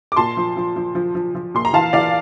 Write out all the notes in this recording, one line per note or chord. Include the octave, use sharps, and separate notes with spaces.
D6
A#2 A5 C6
F3
F3
F3
F3
F3
F3
A#2 C6
A#5
E3 F5 A5
E3 D5 F5